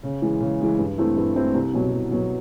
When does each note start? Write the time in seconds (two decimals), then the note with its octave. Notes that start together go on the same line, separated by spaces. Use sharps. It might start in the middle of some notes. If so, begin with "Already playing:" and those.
0.03 C#3
0.22 E3 G#3
0.41 C#3
0.60 E3 G#3
0.79 G2
0.98 E3 A3 C4 E4
1.17 G2
1.36 E3 A3 C4 E4
1.54 C2
1.74 B2 F#3
1.93 C2
2.11 B2 F#3